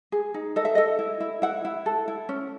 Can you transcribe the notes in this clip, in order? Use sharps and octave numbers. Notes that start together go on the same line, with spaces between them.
G#4
D#4
A4 D#5
E5
A4 D#5
E4
E4
E4 F#5
E4
A4
E4
C#4